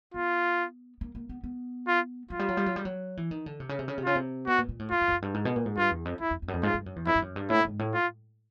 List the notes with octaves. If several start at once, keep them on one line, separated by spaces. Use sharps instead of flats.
B3 F4
A#3
A#3
B3
B3
F4
F#3 F4
G3
F#3
G3
F#3
G3
F#3
E3
D#3
D3
C3
C#3
C3
C#3
C3
C#3 F4
C3
B2 F#4
A#2
A#2
A2
F2 F4
F#2
F2
F#2
G2
G#2
B2
A#2
G#2
G2 F4
E2
F2
F#2 E4
F2
F2
F#2
F2
G#2 F4
G2
F#2
E2
F2 E4
G2
F#2
G2
A2 E4
G#2
A2
F4